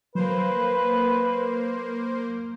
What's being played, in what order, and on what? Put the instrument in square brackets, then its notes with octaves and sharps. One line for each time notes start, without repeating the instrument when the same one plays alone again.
[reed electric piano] F#3 [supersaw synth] A#3 C5 [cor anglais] B4